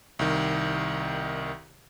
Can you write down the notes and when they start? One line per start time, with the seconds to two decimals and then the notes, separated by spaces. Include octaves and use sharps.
0.19 C2 D#3